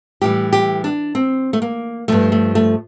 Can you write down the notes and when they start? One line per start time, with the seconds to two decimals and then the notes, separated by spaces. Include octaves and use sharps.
0.21 A2 E3 G3 G4
0.53 G4
0.84 D4
1.15 C4
1.53 A3
1.62 A#3
2.08 G2 F3 A3
2.32 A3
2.55 A3